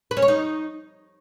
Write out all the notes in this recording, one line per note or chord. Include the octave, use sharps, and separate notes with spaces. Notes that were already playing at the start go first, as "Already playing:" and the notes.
B4
C#4
C#5
D#4